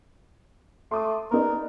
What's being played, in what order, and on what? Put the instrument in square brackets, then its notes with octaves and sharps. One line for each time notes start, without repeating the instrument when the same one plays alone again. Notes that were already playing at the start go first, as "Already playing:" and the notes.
[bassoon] A3 [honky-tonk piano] C6 D6 D#6
[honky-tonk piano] B3 D#4 D5 [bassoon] A#4